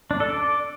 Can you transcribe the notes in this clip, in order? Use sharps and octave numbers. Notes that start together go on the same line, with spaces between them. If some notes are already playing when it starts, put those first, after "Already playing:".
D4
A4
D5